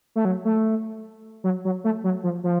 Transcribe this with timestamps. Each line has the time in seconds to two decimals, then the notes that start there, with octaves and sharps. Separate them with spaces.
0.16 A3
0.25 F#3
0.45 A3
1.44 F#3
1.65 F#3
1.84 A3
2.04 F#3
2.24 F3
2.44 F3